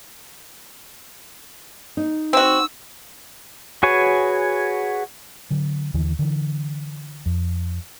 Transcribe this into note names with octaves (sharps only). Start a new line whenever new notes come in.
D#4
C4 F#4 E6
F#4 G#4 B4 C#5 G#5
D3 F#3
D#2 D3 E3
D3 E3
F2